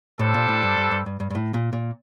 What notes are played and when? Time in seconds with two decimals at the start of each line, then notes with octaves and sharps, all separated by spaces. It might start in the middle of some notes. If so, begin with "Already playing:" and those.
0.19 A2 G3 D4 A4 C5
0.34 A#2
0.49 A2
0.63 G2
0.77 G2
0.91 G2
1.06 G2
1.20 G2
1.30 G2
1.35 A2
1.54 A#2
1.73 A#2